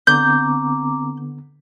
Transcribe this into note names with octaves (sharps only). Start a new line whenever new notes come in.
D3 B3 C4 A#5 D6 G6